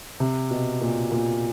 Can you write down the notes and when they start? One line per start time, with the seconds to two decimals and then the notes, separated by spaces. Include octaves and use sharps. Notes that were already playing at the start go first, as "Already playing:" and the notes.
0.20 C3
0.51 B2
0.81 A#2
1.12 A#2